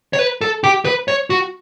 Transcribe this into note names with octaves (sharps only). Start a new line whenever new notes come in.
C#5
B4
A4
G4
B4
C#5
F#4